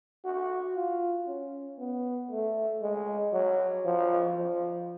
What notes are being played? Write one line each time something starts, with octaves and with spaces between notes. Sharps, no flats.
F#4
F4
C#4
B3
A3
G#3
F#3
F3
F3